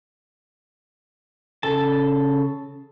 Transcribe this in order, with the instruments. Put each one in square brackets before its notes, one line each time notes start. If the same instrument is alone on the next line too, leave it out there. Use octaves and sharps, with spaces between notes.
[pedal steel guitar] C#3 A4 A5